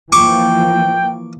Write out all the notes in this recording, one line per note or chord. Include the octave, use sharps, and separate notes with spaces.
E3 F3 A#3 G5 C#6 D6